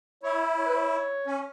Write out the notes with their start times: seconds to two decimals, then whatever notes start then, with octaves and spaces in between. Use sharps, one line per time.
0.23 E4 C#5
0.41 E5
0.58 C#5
0.66 B4
0.75 C#5
1.27 C#4